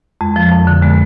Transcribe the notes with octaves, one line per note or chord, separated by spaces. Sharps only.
F2 G#3
F3
F2
D3
D3 G#3 B3